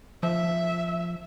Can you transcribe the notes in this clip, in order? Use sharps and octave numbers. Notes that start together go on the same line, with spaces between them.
F3 E5